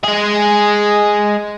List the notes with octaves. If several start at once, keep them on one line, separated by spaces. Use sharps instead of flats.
G#3 G#4